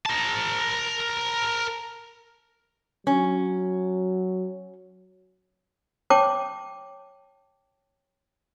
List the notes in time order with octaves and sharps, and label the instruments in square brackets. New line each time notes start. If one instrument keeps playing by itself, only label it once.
[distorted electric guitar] A#4 A5
[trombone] F#3 [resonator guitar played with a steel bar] C#4
[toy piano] C#5 G5 A5 D6